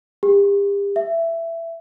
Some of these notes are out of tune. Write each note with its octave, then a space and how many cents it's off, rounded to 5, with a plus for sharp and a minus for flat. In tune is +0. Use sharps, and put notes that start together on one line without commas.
G4 +40
E5 +15